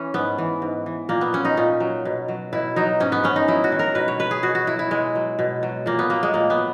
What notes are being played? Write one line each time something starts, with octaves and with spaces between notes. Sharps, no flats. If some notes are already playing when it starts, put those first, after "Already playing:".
Already playing: E3 C#4
G#2 B3
E3
G#2
E3
A#2 A#3
B3
F#3 C#4
D#4
A#2 C#4
F#3
B2
F#3
B2 E4
F#3 D#4
G#2 C#4
B3
G#2 C#4
D#4
F#3 E4
F#4
D#3
A#4
B2 B4
C#5
F#3 B4
G#4
B2 F#4
F#4
F#3 E4
E4
B2 G#3
F#3
B2
F#3
A#2 A#3
B3
F#3 A#3
G#3
A#2 A#3
B3
F#3